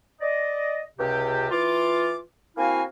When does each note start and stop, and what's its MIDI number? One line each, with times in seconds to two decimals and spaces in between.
0.21 0.83 74
0.21 0.83 75
0.99 1.47 37
0.99 1.47 48
0.99 1.47 67
1.51 2.17 52
1.51 2.17 65
1.51 2.17 86
2.57 2.83 58
2.57 2.83 60
2.57 2.83 64
2.57 2.83 66
2.57 2.83 77
2.57 2.83 80